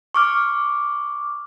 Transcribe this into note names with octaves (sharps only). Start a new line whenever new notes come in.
C#6 D6 F6